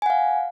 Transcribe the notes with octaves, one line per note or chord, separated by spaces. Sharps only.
F5 F#5 G#5